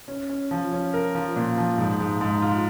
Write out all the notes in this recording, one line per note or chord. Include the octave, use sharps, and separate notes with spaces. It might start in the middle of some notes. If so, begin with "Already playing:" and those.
C#4
C#4
F3
C#4
A#4
F3
A#2
F3
G#2
G#2
G#2
F4